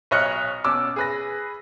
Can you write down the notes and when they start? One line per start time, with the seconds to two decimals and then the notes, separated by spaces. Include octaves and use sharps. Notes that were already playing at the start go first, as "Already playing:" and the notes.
0.11 B1 C#5 D#5 F6 F#6 C#7
0.64 B2 C#4 D6 E6
0.96 G#4 B4 A#6